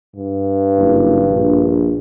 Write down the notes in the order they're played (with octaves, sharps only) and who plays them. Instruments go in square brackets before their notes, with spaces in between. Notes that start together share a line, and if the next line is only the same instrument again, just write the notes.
[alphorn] G2
[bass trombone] F#1
A#1